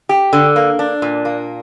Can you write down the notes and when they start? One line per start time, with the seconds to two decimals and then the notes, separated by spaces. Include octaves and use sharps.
0.09 G4
0.33 D3
0.56 A#3
0.79 D4
1.02 A#2
1.25 A#3